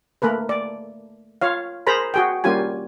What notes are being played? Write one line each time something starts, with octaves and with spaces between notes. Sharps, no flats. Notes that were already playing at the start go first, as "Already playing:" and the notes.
A3 A#3 A#4 B4
D5
F4 C#5 F5
G#4 A#4 C5 A#5 B5
F#4 G#4 G5
G3 A#3 C#4 F4 G4 G#5